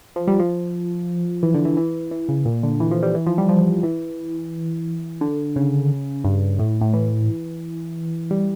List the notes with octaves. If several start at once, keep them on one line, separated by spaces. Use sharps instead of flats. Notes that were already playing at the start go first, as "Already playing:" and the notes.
F3
G3
F3
E3
D3
E3
E3
E3
C#3
A#2
D3
E3
F3
G3
E3
F3
G3
F3
E3
D3
C#3
G2
A2
A2
E3
G3